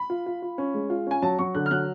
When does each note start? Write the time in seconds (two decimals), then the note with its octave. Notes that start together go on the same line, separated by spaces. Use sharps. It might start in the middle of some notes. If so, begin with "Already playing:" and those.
Already playing: B5
0.10 F4
0.26 F4
0.42 F4
0.58 C#4
0.74 G#3
0.90 F4
1.07 C#4 G#5
1.22 F#3 A5
1.39 F#3 C#6
1.55 D3 F#6
1.66 F6
1.71 F#3 F#6